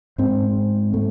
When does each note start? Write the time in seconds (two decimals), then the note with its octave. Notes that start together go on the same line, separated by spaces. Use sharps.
0.18 G#2 C4
0.94 A3